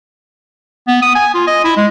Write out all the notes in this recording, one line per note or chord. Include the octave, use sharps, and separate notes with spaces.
B3
D#6
G#5
F4
D#5
E4
G#3